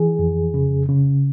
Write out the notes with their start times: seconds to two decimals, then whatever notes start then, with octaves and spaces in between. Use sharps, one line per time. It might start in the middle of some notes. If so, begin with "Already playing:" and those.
Already playing: E3 G#4
0.19 F2
0.54 C#3
0.89 C#3